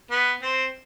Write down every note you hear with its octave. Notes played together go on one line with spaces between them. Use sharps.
B3 B4
C4 C5